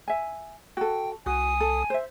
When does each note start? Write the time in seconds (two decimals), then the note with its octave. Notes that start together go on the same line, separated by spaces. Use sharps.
0.08 E5 G#5
0.77 F#4 A4 G5
1.26 C2 F#4 G#5 D#6
1.60 A4
1.90 C5 E5